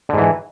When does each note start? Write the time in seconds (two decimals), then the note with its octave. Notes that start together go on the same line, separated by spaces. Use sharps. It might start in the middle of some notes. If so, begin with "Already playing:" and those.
0.09 D3
0.14 G#2
0.18 E3